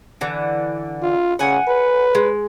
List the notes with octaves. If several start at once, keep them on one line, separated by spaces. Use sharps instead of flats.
D3 E3
F4
C#3 F#5 G#5
B4
G#3